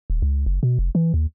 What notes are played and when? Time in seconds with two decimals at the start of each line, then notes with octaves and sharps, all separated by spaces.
0.10 D#1
0.22 C#2
0.46 F#1
0.63 B2
0.79 F1
0.95 E3
1.14 D#2